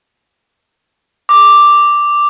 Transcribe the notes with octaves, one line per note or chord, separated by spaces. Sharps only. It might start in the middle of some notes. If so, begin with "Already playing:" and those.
D6